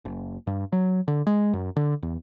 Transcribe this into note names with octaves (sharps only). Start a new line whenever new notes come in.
F#1
G2
F#3
D3
G#3
F#2
D3
E2